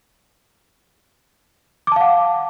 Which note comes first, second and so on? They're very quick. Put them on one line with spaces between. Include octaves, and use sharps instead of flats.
D6 A5 F5 F#5